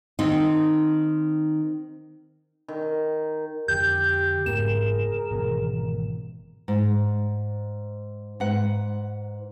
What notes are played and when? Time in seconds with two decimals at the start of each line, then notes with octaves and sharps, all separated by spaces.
0.19 D#3 C4 D#4
2.68 D#3
3.68 F2 D3 G4 G6
4.46 F#1 G#2 B3 G#4 A#4 E7
5.30 G#1 B2 E3
6.68 G#2
8.40 G#2 B4 F#5